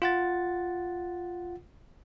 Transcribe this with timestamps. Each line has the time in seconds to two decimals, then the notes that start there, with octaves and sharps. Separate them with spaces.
0.02 F4 F#5 A6